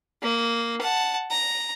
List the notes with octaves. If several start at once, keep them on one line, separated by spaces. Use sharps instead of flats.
A#3
F#5 A5
A#5